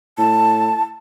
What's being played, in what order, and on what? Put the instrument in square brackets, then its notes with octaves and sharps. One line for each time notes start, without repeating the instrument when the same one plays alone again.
[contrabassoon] A2 [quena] A5